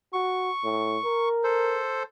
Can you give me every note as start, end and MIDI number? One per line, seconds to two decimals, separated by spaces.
0.13 0.50 66
0.13 1.29 85
0.64 0.97 45
1.05 1.82 70
1.44 2.03 69
1.44 2.03 72